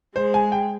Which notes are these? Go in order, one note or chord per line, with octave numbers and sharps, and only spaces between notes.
G#3 C5
G#5
G5